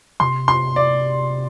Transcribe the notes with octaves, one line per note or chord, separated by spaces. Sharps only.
C3 C6
C6
D5